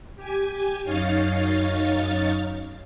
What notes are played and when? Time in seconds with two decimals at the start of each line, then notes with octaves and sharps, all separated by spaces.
0.16 G4 G#5
0.83 F#2 D#4 C#5 F5 A6